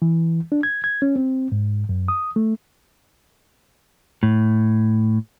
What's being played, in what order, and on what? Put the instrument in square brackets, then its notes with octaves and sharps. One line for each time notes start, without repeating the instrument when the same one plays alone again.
[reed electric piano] E3
D4
G#6
G#6
C#4
C4
G#2
F#2
D#6
A3
[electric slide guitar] A2